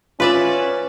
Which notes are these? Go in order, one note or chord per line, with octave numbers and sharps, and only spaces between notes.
C#4 F4 B4 D5 E5